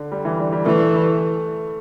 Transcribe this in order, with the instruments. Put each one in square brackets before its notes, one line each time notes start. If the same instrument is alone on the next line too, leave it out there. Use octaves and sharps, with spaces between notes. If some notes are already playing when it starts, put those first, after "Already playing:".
Already playing: [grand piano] D3
G3
E3
G3
G3
[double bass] E3 [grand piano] A3